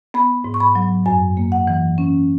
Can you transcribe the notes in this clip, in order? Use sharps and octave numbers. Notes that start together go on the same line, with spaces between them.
B3 B5
G#2
C#6
B5
F#3
F#2 G#5
A#3
F#5
E3
C#4